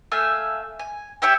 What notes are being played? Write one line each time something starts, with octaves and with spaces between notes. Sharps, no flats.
A3 E5 F5 G#5
G#5
G4 C#5 E5 G5